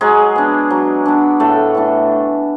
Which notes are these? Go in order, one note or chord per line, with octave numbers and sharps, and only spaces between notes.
F#3 G#3 G#4
B3 D4
F#3
B3 D4
A2 A3 A4
E3 A3 D4